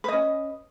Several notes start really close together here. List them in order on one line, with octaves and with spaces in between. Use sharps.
B4 D#5 C#4